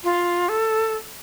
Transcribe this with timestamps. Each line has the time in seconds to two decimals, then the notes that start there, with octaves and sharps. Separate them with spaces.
0.04 F4
0.49 A4